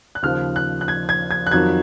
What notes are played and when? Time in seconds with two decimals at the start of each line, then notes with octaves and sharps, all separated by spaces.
0.15 F#6
0.22 D#2 C#3 F3 F6
0.56 F#6
0.81 F#6
0.88 G#6
1.09 G#6
1.31 G#6
1.47 F#6
1.51 F2 D#3 F#3 G#6